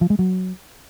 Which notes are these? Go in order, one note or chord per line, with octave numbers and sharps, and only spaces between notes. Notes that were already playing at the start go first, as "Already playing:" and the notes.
F3
G#3
F#3